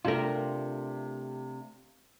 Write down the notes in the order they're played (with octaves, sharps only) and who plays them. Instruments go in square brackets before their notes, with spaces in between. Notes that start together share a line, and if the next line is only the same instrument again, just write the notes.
[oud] C3 A#4 [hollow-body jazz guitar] A3 D4 F4